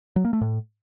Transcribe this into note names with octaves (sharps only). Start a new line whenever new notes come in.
F#3
A#3
A3
A2